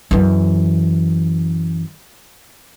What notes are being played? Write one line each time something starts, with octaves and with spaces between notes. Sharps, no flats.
F#2 E3